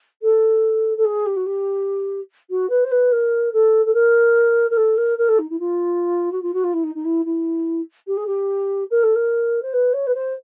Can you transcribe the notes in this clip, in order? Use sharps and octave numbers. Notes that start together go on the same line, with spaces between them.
A4
A4
G#4
G4
F#4
G4
F#4
B4
C5
B4
A#4
A4
A4
A#4
A#4
A4
A#4
A#4
A4
D#4
E4
F4
F#4
F4
F#4
F4
E4
D#4
D#4
E4
E4
G4
G#4
G4
A#4
A4
A#4
C5
B4
C#5
B4
C5